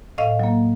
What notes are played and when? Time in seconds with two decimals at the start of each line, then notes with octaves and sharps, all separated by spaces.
0.18 A2 D#5 F5
0.39 F#3 A#3